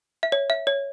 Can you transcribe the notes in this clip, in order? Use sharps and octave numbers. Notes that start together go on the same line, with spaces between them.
E5
C#5
E5
C#5